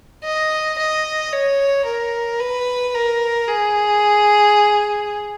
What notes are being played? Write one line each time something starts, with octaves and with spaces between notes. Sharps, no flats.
D#5
D#5
C#5
A#4
B4
A#4
G#4